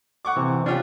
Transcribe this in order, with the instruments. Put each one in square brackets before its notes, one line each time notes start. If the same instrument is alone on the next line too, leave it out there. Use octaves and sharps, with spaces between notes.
[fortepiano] F#5 C#6 D6
[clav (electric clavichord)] C3 E3
[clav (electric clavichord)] C#4 [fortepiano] D4 F4 G4